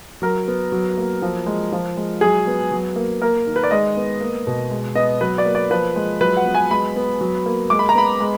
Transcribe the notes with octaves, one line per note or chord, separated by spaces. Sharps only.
F#3 A#4
B3
F#3
A#3
F3
G#3
F3
G#3
F#3 G#4
B3
F#3
A#3
A#3 A#4
D#3
B4
D5
G#3 D#5
B3
A#3
B2
G#3
B3 D#5
F#3 B4
D5
A#3
D5
F3 B4
G#3
F#3 B4
F#5
B3
G#5
G#3 B5
B3
F#3
A#3
G#3 D6
B5
A#5
B3 B5
G#3